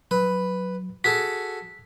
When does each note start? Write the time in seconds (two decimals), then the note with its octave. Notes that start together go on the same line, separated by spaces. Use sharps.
0.11 F#3 B4
1.04 F#4 G#4 A4 B6